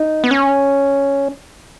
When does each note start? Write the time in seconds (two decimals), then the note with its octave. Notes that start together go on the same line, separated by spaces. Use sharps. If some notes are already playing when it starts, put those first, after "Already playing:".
Already playing: D#4
0.24 B3
0.31 C#4